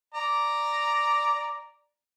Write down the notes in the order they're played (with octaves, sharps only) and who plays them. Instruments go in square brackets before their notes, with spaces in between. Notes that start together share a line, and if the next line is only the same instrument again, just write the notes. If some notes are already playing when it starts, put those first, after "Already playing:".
[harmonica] D5 A#5